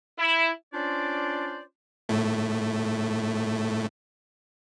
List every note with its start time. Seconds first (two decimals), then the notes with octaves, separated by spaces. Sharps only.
0.18 E4
0.73 C#4 D4 F4 C5 D5
2.09 A2 A3